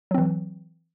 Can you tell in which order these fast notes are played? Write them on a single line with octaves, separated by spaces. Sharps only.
F#3 C4 E3